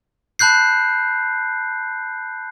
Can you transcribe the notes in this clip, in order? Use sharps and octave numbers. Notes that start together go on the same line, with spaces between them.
A5 B5 F#6 G6 C7